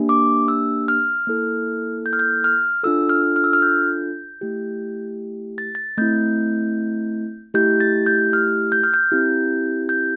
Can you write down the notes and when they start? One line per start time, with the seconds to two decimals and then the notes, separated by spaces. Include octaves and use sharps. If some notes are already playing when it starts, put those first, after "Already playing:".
Already playing: A#3 D4 G4
0.09 D6
0.48 E6
0.88 F6
1.27 A#3 E4 A4
2.06 G6
2.13 F6
2.19 G6
2.44 F6
2.83 D4 F4 A4 E6
3.09 F6
3.36 F6
3.44 E6
3.53 F6
3.62 G6
4.41 A3 E4 G4
5.58 A6
5.75 A6
5.97 A3 C4 E4 G6
7.54 A3 E4 G4 G6
7.80 A6
8.06 G6
8.33 F6
8.72 G6
8.83 F6
8.94 G6
9.12 C4 E4 G4
9.89 G6